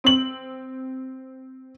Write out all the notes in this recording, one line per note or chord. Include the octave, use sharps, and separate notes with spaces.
C4 F#7